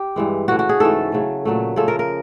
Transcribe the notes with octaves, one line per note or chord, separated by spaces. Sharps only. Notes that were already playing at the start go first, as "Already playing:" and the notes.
Already playing: G4
G2 E3 G#3
C#3 E3 A3 F#4
F#4
G#4
G#2 E3 A3 A4
C#3 F#3 A3
A#2 F#3 A3
C#3 F3 A3 A4
A#4
A#4